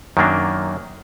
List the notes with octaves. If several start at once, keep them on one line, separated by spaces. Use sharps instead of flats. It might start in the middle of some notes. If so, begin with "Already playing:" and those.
F#2 D#3 F#3 A#3 D4